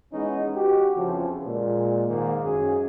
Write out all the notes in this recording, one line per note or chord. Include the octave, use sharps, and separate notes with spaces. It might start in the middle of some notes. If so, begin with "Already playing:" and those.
E3 G#3 B3 C#4 D#4
F#4 G4
F2 C#3 E3 F3
A#2 G#3
G#2 D#3 A#3
F#2 G#4